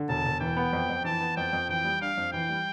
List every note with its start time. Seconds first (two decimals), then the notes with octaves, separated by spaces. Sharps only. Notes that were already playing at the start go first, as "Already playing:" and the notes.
Already playing: D3
0.09 E1 A5
0.26 E1
0.41 E3 G5
0.57 B3
0.73 F2
0.89 F2
1.04 E3 A5
1.20 B3
1.37 F2 G5
1.53 F2
1.69 E3 G5
1.85 G3
2.02 D4 F5
2.17 F2
2.32 E3 G5
2.49 G3